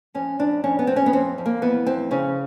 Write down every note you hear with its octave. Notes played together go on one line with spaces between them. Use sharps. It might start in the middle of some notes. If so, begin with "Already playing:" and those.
F2 C#4
F2 D4
F2 C#4
B3
F2 C4
C#4
B3
F2 C4
F2
A#3
E3 B3
F2 C4
C#3 C#4